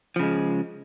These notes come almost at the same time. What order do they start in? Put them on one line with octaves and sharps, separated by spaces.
F3 C#3 G#3